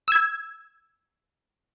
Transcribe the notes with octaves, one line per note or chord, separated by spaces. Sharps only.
E6 G#6